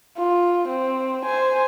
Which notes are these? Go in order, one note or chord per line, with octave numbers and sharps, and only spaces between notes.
F4
C4
C5 G#5